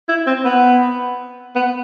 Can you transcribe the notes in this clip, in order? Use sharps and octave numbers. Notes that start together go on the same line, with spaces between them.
E4
C4
B3
B3